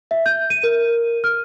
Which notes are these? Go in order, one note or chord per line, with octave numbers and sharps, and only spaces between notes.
E5
G6
D#7
A#4
F6